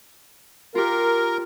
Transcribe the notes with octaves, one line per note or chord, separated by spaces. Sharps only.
F4 G4 A#4